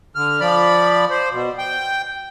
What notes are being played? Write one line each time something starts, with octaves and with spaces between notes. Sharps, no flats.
D3 F6
F3 D5 B5
C5
B2
G5